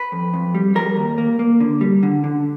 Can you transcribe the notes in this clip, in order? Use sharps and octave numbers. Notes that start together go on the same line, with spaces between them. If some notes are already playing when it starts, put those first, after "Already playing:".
Already playing: B4
F2
F2
G3
G3 A#4
D#2
A#3
A#3
D3
G3
D3
D3